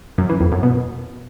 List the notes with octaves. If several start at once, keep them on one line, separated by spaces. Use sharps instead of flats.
F#2
E3
F2
F#2
B2